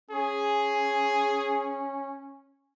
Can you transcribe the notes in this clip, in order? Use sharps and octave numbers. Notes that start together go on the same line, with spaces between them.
C#4 G#4